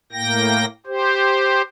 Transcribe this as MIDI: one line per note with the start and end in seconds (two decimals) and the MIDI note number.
0.12 0.65 45
0.12 0.65 58
0.12 0.65 79
0.12 0.65 94
0.86 1.62 67
0.86 1.62 72